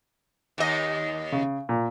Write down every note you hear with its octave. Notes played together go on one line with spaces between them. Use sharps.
D#2 D#5
C#3
A#2